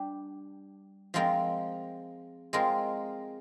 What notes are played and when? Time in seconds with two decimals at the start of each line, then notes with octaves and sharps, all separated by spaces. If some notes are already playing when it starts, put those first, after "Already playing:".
Already playing: G3 D4 G4
1.14 F3 G#3 C4 F4 A#4
2.53 G#3 C4 F4 A#4